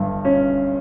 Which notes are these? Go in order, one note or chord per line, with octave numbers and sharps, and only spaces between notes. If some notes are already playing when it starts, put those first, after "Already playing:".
Already playing: G1 G2
C#4